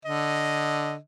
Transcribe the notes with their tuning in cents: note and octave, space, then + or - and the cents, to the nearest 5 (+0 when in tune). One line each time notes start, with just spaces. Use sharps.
D3 +0 D#5 +0